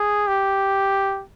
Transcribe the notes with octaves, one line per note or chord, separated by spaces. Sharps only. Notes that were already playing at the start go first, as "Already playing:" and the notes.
Already playing: G#4
G4